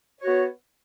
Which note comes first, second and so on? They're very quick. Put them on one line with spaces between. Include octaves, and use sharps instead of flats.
C#5 F#4 B3